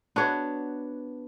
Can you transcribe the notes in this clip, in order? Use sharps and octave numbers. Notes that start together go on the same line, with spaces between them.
B3 D4 F#4 C#5